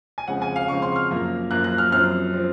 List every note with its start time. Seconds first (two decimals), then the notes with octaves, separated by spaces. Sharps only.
0.18 G#5
0.28 F2 C#3 G#3 C4 F#5
0.42 G#5
0.56 F5
0.68 F2 C#3 G#3 C4 C#6
0.82 C6
0.96 F6
1.10 F#2 F3 A#3
1.51 F#2 F3 A#3 F#6
1.64 F#6
1.78 F6
1.92 F#2 F3 C4 F6
2.33 F3 C4